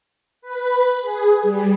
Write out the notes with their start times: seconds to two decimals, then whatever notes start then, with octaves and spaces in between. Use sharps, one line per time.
0.42 B4
1.01 G#4
1.42 G3